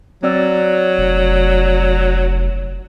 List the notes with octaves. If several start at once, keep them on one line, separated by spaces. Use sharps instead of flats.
F#3 C4 D5 E6
F1